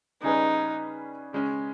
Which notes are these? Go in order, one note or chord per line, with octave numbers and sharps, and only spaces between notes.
C#3 G3 C#4 D#4 G#4 B4
C#3 G#3 C#4